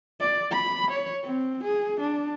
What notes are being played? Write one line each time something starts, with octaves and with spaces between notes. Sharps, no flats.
D5
B5
C#5
C4
G#4
D4